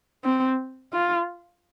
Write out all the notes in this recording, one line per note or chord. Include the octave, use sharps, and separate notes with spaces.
C4
F4